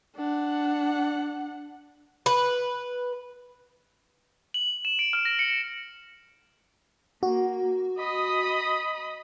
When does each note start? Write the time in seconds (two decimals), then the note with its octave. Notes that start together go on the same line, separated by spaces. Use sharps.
0.16 D4 F#5
2.26 B4
4.54 F#7
4.85 E7
4.99 D7
5.13 F6
5.25 A#6
5.39 C#7
5.50 C#7
7.23 A#3 F#4
7.98 D#5 B5 D#6